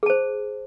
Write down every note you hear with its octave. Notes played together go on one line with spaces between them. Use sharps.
G#4 C5 A5